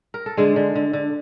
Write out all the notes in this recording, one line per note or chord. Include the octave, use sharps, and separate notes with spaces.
A#4
A4
D3 G#3 G#4
D3
D3
D3